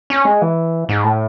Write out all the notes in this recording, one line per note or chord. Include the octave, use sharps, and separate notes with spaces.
C#4
G#3
E3
G#2
A2